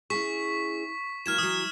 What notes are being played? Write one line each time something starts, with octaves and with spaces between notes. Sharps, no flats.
C#4 E4 G#4 C#6 B6
E3 F#3 A#3 F6 G#6 E7
E3 F#3 D#6